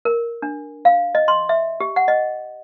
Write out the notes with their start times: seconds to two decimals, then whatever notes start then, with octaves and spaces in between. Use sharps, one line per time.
0.05 A#4
0.42 D4
0.85 F5
1.15 D#5
1.28 C6
1.49 E5
1.80 G4
1.96 F#5
2.08 D#5